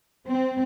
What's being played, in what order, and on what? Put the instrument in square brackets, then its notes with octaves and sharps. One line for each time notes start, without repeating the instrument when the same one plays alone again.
[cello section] C4